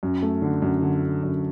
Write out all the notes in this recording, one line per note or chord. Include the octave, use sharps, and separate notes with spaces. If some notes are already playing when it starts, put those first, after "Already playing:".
F#2
A3
D3
F#2
D3
D3
F#2